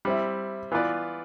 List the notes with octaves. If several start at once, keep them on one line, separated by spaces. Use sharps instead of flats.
G3 C4 E4
E3 B3 F4 B4 D5